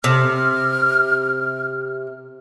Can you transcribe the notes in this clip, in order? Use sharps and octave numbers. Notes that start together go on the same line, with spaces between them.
C3 F6